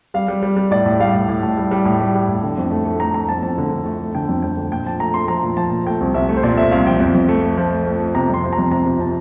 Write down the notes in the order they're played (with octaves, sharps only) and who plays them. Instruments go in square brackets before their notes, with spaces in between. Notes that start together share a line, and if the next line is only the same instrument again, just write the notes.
[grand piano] G3 F5
G3
G3
G3
A2 D5
A2
G3 F5
A2
A2
A2
G3
G3
A2
G3
G3
A2
D3
F2
A3
A3
A3 A#5
A3 A#5
F2 A5
F2 A5
D3
D3
A3
A3
D3 G5
F2
F2 G5
D3
A#2 G5
F3 A5
A3 A#5
A3 C6
F3 A#5
A#2
F3 A5
A#2
A3 G5
C2
C2 E5
A3
C5
A#2 D5
A3 E5
C2 F5
F3 G5
F2
F2
A3
A3
F3
A3
A3
A3
C3 A#5
F2 C6
F3
A#5
F2
C3 A#5
C3
C3 A5